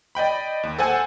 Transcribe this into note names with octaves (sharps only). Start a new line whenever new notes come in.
D5 D#5 G5 B5
D#2
A4 C5 F#5 G#5 A5